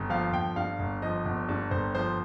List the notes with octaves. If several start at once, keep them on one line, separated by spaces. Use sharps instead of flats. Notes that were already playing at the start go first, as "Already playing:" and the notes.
Already playing: G1
F3 F5
G1 G5
G2 F5
G1
F3 D#5
G1
G2
G1 C5
F3 C5